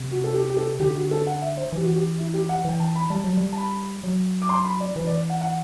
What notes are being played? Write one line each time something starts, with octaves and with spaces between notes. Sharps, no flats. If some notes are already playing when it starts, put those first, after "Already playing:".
Already playing: C3
F#4
A4
G4
G4
A4
D3 G4
F#4
A4
F#5
E5
C5
E3 G4
F#4
G4
E4
G4
F#5
E3 G5
A5
B5
G3 A5
F#3
G3
A5
B5
F#3
D6
C6
B5
D5
E3 B4
D5
F#5
F#5